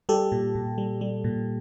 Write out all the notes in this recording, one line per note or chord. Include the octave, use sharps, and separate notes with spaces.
G3 G4 A4
A#2
A#2
G3
G3
A#2